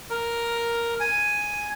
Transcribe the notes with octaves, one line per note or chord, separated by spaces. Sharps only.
A#4
G#5